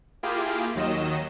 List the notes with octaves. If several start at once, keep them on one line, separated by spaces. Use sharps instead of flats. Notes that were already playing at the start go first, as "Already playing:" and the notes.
A#3 E4 F4 G4 G#4
D#2 D#3 F#3 D#5 E7